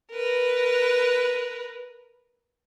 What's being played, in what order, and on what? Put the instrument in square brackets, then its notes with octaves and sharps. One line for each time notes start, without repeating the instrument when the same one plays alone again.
[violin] A#4 B4